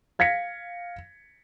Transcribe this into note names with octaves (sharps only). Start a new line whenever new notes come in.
F5 G#6 A#6 B6 C#7